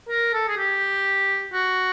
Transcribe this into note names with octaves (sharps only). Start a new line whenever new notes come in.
A#4
A4
G#4
G4
F#4